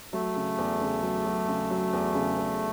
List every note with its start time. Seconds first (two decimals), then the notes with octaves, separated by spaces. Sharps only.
0.13 F#3 A3
0.36 C#3
0.58 E2
0.81 C#3
1.03 F#3
1.26 F#3
1.49 C#3
1.71 F#3
1.93 E2
2.15 C#3
2.38 E2